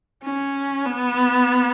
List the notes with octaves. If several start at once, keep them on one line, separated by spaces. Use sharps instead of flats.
C#4
B3